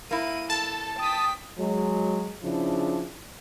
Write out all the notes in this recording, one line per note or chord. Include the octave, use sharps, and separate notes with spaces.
A#3 E4 D#7
A4 A5
G5 D#6 B6
F#3 G#3
C#3 F3 D4 E4